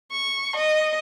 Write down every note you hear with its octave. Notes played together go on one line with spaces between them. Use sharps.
C#6
D#5